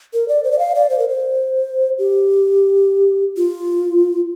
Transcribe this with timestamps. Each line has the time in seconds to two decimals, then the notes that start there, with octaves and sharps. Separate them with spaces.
0.13 A#4
0.28 D5
0.44 C5
0.52 D5
0.59 F5
0.75 D5
0.90 C5
0.99 A#4
1.09 C5
1.99 G4
3.37 F4